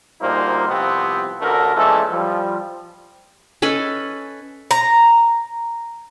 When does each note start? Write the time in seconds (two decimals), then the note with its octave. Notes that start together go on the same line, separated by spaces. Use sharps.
0.21 D2 A#2 G3 A#3 D#4 C5
0.69 C2 C3 F3 B3 C4
1.41 A1 D2 D3 A3 A#4
1.76 A#2 E3 G#3 A3 C#4 A4
2.10 F3 G3
3.62 C#4 A4 B4 D#5
4.71 A#5